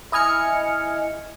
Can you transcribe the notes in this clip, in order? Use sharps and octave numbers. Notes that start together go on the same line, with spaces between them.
E4 D#5 G#5 F6 C#7